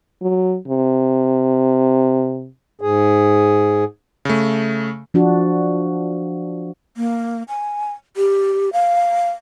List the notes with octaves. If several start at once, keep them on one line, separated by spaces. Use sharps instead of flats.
F#3
C3
G#2 G#4
C#3 A3
F3 D4 F#4
A#3
G#5
G4
F5